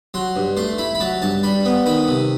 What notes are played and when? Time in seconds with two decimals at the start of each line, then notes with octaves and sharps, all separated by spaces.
0.14 F#3 C6
0.36 G2
0.57 A3 C6
0.78 E4 B5
0.95 B5
1.00 F#3 A5
1.22 G2 A5
1.43 G3 B5
1.65 B3
1.86 D#3 B5
2.08 C3